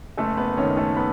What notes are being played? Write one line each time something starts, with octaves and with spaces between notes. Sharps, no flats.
F#1 A3 A4
B3 B4
F#2 D#3 C#4 C#5
A3 A4
B3 B4